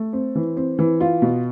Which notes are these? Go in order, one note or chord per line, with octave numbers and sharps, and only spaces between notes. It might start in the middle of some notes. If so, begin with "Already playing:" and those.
Already playing: A3
C4
E3
C4
E3
F4
B2